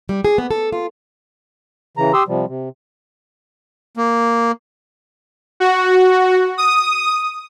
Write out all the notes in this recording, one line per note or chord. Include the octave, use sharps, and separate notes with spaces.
G3
G#4
B3
A4
F4
C#3 E3 A#5
G4 C6 D#6 E6
C3 F3 G3
C3
A#3
F#4
D#6